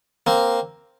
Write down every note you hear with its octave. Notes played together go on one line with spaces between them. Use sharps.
A#3 C4